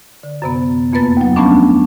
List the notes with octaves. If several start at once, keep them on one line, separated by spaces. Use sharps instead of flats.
D3
F#2 C3 B3
F2 A#3 B3 B4 A6
D#2 F#3
F3 G3 A3 B3 C#4 D4